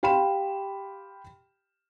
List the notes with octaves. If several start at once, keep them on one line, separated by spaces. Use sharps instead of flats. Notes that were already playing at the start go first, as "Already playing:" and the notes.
G4 F5 G5 B5 C6 E7